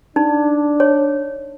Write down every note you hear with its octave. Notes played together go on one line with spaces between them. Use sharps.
D4 D#4
C#5